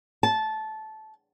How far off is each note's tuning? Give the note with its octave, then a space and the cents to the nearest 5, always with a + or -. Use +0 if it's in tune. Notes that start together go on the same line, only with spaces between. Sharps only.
A5 -15